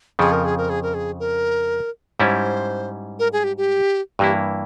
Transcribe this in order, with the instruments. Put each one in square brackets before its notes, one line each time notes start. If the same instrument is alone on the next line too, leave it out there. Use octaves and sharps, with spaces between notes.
[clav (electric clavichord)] F2 C#3 F3 [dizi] G#4
[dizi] A#4
G#4
A#4
G#4
A#4
G#4
A#4
[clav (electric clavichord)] G#2 G3 C#4 E4 [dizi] C5 C#5
[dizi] A#4
G#4
G4
G4
[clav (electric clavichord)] G2 E3 A#3 E4 [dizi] G4